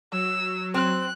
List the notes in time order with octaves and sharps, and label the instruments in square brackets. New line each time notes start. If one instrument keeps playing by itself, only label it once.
[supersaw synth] F#3 [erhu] E6
[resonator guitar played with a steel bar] C4 [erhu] F#6